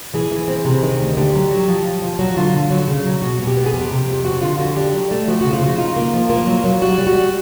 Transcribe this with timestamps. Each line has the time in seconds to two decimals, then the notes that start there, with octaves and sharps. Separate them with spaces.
0.14 E3 G#4
0.32 E3
0.48 C4
0.65 C3
0.82 D#3
1.00 D2
1.17 D3 G4
1.34 F#3
1.51 F#3
1.68 F3
1.85 F3
2.02 F3
2.19 F#3 F#4
2.37 D3 F4
2.53 D3
2.71 F#3
2.88 C#3
3.06 F#3
3.22 B2 F#4
3.40 B2
3.47 G4
3.57 B3
3.66 G#4
3.73 F2 G4
3.91 C3
4.08 F2
4.25 F2 F#4
4.41 D3 F4
4.59 D3 F#4
4.76 D4 G4
4.93 F#3
5.11 A3
5.28 F3 F#4
5.41 C#3 F#4
5.53 F4
5.61 C#3 F#4
5.78 D#4 F4
5.96 A#3
6.14 F3
6.30 A#3 F4
6.47 F#3
6.64 F#3
6.82 G3 F#4
6.98 G3
7.07 F#4
7.16 G3